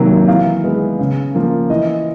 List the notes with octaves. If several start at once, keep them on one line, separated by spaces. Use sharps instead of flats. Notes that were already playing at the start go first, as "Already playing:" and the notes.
Already playing: C3 D#3 F#3 A#3
E3 F5
G#3 B3
C#3
F3 A#3
E3 D#5